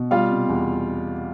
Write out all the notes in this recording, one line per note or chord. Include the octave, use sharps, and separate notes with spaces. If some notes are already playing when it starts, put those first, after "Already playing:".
Already playing: B2
G3 F4 F5
C3
E2